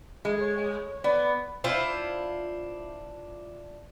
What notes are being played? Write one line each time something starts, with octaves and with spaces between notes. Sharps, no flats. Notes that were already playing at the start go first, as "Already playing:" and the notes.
G#3
C#5
B3 D5
D4 E4 F4 C5